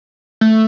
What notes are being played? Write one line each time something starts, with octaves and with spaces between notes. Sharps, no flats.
A3